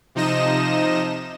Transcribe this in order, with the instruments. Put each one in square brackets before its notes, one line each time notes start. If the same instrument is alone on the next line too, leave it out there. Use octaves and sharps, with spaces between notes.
[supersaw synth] C3 F3 D#4 D#5 A#6 E7